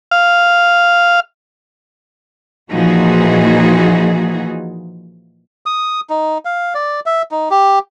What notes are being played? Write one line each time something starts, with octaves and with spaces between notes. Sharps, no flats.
F5
A#2 E3 F3 D#4 F#4 G#4
D#6
D#4
F5
D5
E5
D#4
G4